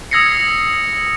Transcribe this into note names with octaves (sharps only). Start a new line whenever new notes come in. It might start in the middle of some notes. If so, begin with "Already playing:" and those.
D#6 E6 G#6 A#6 C7 C#7